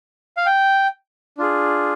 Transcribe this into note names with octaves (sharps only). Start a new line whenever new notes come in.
F5
G5
D4 F4 G#4